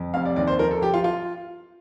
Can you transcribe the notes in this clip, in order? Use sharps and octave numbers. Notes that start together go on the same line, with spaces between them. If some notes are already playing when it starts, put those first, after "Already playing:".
Already playing: F2
F1 F5
D5
D#2 D5
C5
F3 A#4
A4
F3 G4
F4
F4